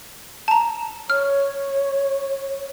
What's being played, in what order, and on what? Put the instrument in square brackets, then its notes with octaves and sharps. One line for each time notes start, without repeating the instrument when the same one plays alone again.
[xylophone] A5 A#5
[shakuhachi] C#5 [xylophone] F6